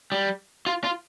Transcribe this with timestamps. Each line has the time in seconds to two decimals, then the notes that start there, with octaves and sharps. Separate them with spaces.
0.12 G3
0.66 F4
0.84 F4